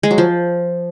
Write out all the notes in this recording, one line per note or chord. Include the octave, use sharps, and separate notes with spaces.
G#3
F#3
F3